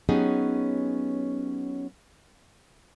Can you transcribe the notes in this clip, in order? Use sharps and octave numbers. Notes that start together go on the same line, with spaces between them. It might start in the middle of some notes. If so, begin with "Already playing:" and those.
F#3 B3 C#4 D#4 G4 G#4